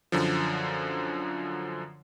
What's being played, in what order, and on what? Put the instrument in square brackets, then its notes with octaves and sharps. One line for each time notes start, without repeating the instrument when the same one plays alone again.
[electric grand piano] F#2 D3 F3